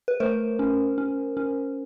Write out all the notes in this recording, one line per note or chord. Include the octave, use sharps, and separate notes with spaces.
B4
A3 A#4 C5
C#4
C#4
C#4